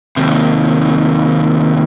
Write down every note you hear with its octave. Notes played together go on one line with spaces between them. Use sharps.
D#2 C3